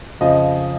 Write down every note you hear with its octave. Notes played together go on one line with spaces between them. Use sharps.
F2 C#3 F3 D#5